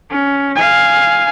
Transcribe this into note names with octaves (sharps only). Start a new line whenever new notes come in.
C#4
F5 G#5